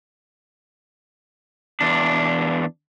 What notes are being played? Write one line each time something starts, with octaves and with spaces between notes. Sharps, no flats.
E2 D4